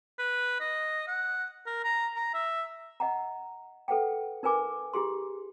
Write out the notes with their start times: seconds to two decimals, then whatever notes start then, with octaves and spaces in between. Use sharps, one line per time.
0.19 B4
0.61 D#5
1.07 F#5
1.66 A#4
1.84 A#5
2.16 A#5
2.34 E5
3.00 D#5 F#5 A#5
3.88 A4 B4 F#5 G5
4.43 D#4 A#4 B4 G#5 D6
4.93 E4 G4 G#4 C6